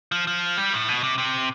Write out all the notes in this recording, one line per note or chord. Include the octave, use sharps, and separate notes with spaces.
F3
F3
G3
A2
B2
C3
C3